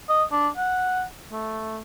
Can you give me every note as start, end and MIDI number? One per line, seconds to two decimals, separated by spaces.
0.09 0.24 75
0.32 0.48 62
0.57 1.03 78
1.32 1.81 57